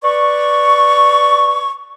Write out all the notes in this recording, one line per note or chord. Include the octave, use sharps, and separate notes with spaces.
B4 D5 C#6